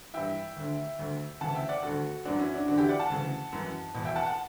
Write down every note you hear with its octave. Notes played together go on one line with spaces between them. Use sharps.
G2 E3 E5 G5
D2 D3
D2 D3
D2 C#3 E3 F#5 A5
E5 G5
D5 F#5
D2 D3 F#4 A4
F#2 E3 D4 F#4
C#4 E4
D4 F#4
E2 D3 D4 F#4
E4 G4
D5 F#5
F#5 A5
D2 C#3 E3
F#2 E3
E2 B2
E5 G5
F#5 A5
F#5 A5